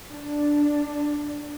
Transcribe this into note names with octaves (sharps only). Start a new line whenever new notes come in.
D4